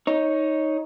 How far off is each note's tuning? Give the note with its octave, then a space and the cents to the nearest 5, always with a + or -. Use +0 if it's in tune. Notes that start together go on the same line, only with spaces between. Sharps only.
D#4 +10 C#5 +0